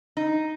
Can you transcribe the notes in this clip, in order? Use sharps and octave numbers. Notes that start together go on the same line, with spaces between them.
D#4